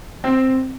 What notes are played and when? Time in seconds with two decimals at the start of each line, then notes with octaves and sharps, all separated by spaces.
0.24 C4